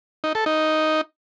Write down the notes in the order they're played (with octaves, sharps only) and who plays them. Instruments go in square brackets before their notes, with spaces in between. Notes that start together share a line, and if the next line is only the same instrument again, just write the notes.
[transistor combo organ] D#4
A4
D#4